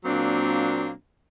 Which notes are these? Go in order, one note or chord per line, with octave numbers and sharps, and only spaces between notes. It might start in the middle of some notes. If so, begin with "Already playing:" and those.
A#2 F#3 A#3 C4 D4